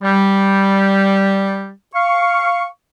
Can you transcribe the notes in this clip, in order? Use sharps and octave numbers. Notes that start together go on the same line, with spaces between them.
G3
F5 C#6